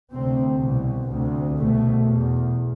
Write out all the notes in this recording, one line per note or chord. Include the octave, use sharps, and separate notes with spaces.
D2 C3 C4
C2 B2
D2 C3
C2 B2 A3
E2 B2